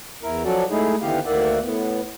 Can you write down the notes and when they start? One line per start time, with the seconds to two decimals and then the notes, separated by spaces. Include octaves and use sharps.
0.23 E2 E4 A#4
0.45 F3 F#3 C#4 F#4 A4 D5
0.71 G#3 A3 D#4 E4 G#4
1.02 D#2 D3 E3 B3 G4 F5
1.25 D2 D#3 A#3 D5 E5 F#5
1.62 A2 B3